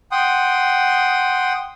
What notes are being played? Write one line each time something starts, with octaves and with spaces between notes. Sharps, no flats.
F#5 G5 C6 D#6